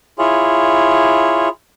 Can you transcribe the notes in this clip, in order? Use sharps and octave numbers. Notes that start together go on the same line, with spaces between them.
E4 F4 G#4 C#5